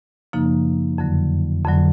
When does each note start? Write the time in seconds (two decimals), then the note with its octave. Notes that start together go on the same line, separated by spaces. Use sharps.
0.33 F#2 C#3 F3 A#3 D#4
0.98 F2 D3 F#3
1.65 F2 D3 F#3